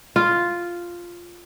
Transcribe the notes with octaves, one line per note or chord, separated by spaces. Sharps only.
F4